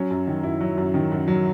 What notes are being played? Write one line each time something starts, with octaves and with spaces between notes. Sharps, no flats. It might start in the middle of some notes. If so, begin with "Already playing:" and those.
Already playing: F#3 C#4
F#2
D#3
F#2 E4
F#3
F#2
D#3
F#2
F#3